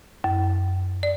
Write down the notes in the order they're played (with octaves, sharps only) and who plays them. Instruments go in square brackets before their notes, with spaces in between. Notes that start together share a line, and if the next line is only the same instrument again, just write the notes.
[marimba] F#2
D5